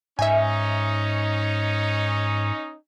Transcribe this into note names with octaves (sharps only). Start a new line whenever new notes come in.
G#2 C#4 D#4 E5 G#5